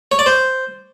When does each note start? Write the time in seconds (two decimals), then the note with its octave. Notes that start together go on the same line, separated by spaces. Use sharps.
0.12 C#5
0.19 D5
0.26 C5